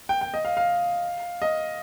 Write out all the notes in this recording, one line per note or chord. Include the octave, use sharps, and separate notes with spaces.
G5
G5
D#5
F5
F5
D#5